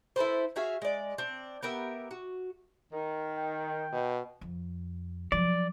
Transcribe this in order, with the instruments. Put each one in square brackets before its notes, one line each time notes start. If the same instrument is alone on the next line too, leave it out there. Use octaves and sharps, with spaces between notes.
[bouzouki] E4 A4 B4 C5
F#4 G#4 E5 F5
G#3 D5
C4 D4
B3 G4 A#4 E5
F#4
[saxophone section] D#3
[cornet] G5
[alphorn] B2
[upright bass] F2
[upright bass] F3 F#3 [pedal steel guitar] D5